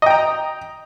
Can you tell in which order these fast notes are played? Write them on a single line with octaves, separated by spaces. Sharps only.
D#5 G5 A#5